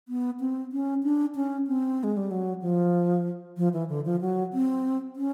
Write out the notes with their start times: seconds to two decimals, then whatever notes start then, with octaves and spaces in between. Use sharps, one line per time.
0.08 B3
0.40 C4
0.72 C#4
1.03 D4
1.35 C#4
1.67 C4
2.04 G#3
2.17 G3
2.31 F#3
2.62 F3
3.57 F3
3.73 E3
3.89 D3
4.05 F3
4.21 F#3
4.53 C4
5.16 C#4